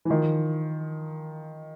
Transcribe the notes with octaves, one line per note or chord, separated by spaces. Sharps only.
E3
D#3 F3